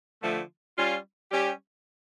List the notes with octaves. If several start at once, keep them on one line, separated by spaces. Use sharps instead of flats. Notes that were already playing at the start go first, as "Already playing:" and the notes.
D3 F3 A3
G3 C#4 F4
G3 C#4 G4